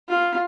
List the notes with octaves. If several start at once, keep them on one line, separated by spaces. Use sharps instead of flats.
F4